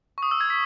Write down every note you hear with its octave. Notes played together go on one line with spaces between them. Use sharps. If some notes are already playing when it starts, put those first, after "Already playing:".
C#6
D#6
E6
G#6
B6